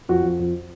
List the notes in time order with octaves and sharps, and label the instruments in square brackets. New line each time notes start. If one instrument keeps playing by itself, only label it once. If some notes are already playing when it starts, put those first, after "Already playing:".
[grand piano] F2 F#4
F2
F2